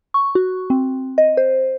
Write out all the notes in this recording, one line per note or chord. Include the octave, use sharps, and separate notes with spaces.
C#6
F#4
C4
D#5
C5